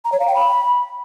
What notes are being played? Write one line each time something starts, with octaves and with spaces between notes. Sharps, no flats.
A#5
C#5
F5
G5
B5